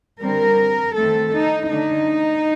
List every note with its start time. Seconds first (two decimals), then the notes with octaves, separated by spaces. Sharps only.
0.21 D3 G3 C4 A#4
0.96 D#3 A3 C4 A4
1.33 D#4
1.69 D3 A3 D4 D#4